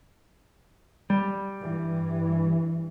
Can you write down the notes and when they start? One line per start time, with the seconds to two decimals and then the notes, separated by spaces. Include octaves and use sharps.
1.10 G3
1.59 G2 E3